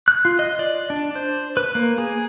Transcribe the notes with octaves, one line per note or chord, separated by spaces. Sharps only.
F#6
F4
D#5
D5
D4
C5
B4
A#3
G#4